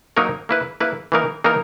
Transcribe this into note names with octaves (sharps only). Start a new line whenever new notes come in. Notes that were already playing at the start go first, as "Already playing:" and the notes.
F#3 A#3 D#4 A#4 C#5
A#3 E4 B4
A#3 E4 B4
E3 A#3 D#4 A#4
E3 A#3 D#4 A#4